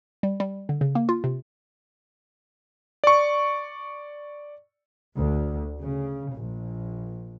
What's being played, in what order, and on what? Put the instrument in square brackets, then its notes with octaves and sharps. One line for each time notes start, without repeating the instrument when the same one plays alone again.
[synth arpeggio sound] G3
G3
D3
C#3
A#3
F4
C3
[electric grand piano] D5 C#6
[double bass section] D2
C#3
A#1